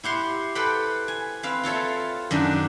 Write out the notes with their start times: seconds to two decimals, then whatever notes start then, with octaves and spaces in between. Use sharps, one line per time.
0.03 E4 G4 F#5 C6
0.55 A4 B4 C5 F#5 G5 B5
1.08 G#5
1.43 C4 B4 F5
1.63 F4 A4 C#5 E5
2.31 F#2 D#3 D4 B5